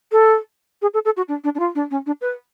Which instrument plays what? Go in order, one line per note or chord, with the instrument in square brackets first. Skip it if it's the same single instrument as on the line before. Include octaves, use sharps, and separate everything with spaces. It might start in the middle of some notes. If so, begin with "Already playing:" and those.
[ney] A4
G#4
A4
A4
F#4
D4
D4
D4
F4
D4
C#4
D4
B4